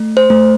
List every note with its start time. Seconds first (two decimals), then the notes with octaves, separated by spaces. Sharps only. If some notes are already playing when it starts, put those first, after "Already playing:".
Already playing: A3
0.17 C5
0.30 A3